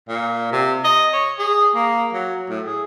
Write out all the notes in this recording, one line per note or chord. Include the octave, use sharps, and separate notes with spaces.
A#2
C3
D#5
C#5
G#4
A#3
F#3
A2
G#4